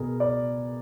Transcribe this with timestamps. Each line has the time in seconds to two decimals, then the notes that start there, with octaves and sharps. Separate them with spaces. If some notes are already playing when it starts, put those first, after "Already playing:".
Already playing: B2 G#4 A#4
0.20 D5